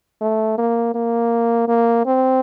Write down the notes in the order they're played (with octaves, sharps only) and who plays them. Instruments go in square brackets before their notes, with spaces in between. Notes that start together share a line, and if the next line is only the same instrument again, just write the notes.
[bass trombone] A3
A#3
A#3
A#3
C4